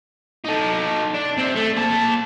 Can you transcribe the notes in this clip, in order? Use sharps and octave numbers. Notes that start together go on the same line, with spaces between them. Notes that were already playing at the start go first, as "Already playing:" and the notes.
D#4 A4
D4
C3 C4
A3
A#3 A5